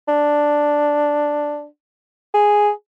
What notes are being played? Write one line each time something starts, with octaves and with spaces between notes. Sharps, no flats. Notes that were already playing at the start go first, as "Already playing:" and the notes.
D4
G#4